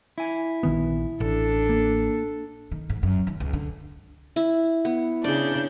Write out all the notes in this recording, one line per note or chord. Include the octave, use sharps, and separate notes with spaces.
E4 G#5
A#1 D#3 B3
A1 D4 A4
A#3
D#3
G#2
F#2
D#2
C#2
D3
E4
B3
C#3 D4 G#4 D5 G6